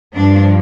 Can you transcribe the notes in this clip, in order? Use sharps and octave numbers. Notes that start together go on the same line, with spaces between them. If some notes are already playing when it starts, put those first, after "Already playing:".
G2 F3 D4